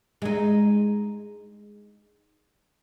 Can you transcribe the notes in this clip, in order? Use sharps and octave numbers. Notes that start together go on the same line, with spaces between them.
G#3 D#4